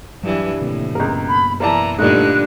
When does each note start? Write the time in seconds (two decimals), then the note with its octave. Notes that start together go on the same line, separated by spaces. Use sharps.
0.23 G2 E3 F#3
0.61 A2 C3 D#3 A#3
0.95 C#2 F#2 B2 A#3 A#4
1.28 B5
1.60 E3 A#4 D5 A5 A#5
1.99 G2 A#2 D3 A3 D#4 F#6